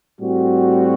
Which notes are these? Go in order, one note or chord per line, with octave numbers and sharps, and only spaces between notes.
A2 G3 C4 F#4